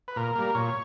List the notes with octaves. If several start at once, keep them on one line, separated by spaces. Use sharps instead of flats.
B4
A#2 A#4
G3 A#3
A#2 C#5